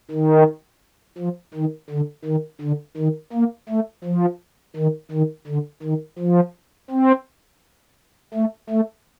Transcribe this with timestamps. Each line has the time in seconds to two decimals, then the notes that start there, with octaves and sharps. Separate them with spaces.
0.11 D#3
1.18 F3
1.54 D#3
1.90 D3
2.25 D#3
2.61 D3
2.97 D#3
3.33 A#3
3.69 A3
4.05 F3
4.76 D#3
5.12 D#3
5.47 D3
5.83 D#3
6.19 F3
6.91 C4
8.34 A3
8.70 A3